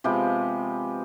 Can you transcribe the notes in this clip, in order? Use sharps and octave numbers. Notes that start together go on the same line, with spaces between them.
C3 F3 G#3 B3 G4